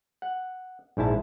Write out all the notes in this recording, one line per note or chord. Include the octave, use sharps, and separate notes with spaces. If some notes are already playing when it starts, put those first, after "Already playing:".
F#5
A#1 G#2 E4 A5